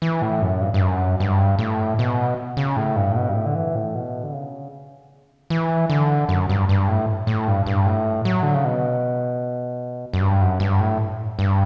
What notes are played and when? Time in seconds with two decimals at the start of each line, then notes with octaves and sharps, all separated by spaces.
0.02 E3
0.22 A2
0.42 F#2
0.61 G2
0.74 G2
0.81 F#2
1.20 G2
1.59 A2
1.99 B2
2.57 C#3
2.76 A2
2.96 G2
3.12 A2
3.16 B2
3.29 G2
3.35 A2
3.46 D3
3.55 E3
3.75 A2
3.95 B2
4.23 D3
4.33 C#3
5.50 E3
5.90 D3
6.29 F#2
6.49 G2
6.69 G2
6.88 A2
7.27 A2
7.48 G2
7.66 G2
7.86 A2
8.25 F#3
8.43 D3
8.54 C#3
8.65 B2
10.13 F#2
10.21 G2
10.41 F#2
10.60 G2
10.80 A2
11.39 G2